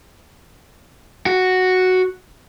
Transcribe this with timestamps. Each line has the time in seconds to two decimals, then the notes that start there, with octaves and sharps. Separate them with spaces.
1.26 F#4